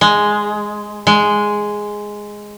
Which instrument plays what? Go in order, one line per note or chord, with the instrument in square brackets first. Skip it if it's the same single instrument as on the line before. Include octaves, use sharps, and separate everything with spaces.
[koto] G#3
G#3